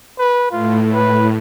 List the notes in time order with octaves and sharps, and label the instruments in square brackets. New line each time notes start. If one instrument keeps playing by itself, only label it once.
[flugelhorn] B4
[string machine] A2 [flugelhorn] F4
[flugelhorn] B4